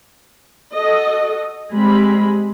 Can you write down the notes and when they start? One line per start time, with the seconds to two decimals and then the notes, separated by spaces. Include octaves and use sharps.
0.74 F#4 A4 D#5
1.73 G3 G#3 C4 B5